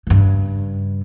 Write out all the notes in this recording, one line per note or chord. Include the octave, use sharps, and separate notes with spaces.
G2 C#3